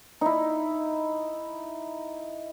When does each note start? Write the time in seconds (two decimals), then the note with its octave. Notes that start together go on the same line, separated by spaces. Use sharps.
0.21 D#4 E4